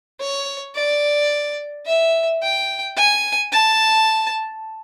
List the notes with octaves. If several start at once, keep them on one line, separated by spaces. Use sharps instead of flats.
C#5
D5
E5
G5
G#5
A5